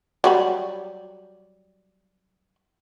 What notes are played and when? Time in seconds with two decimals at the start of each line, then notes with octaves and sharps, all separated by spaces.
0.24 F#3 G3 B5